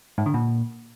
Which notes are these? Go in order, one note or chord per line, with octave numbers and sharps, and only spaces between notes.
G#2
D3
A#2